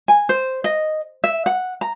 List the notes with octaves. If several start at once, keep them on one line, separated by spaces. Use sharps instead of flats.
G#5
C5
D#5
E5
F#5
A#5